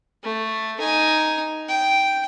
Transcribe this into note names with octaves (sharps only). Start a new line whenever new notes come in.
A3
D#4 G#5
G5